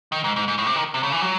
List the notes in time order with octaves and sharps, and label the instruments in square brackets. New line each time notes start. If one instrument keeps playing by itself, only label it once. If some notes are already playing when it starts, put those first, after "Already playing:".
[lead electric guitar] D#3
G#2
G#2
G#2
A2
C3
D#3
C3
C#3
E3
F#3